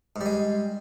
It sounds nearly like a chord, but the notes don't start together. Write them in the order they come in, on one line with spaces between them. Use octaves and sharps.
G#2 G3 G#3